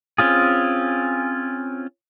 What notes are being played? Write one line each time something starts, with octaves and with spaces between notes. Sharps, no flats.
C4 C#4 F4 G#4